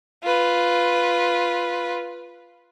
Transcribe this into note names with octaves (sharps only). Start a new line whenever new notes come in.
F4 B4